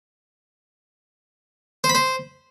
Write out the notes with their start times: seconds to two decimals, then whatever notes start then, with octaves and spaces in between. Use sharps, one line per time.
1.84 C5
1.89 B5
1.95 C5